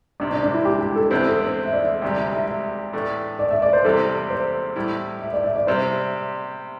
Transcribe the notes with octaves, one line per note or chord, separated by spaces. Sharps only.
C2 C3 G3 D4
D4
D4
E4
G4
G4
A4
E2 D3 C4 E4 C5
A4
C5
E5
D5
E5
D2 C3 G3 D5
E5
E5
E5
A2 E3 A3 D4
D5
E5
D5
C5
E2 C3 G3 A4
C5
A2 G3 E4
E5
D5
E5
D5
C3 G3 C5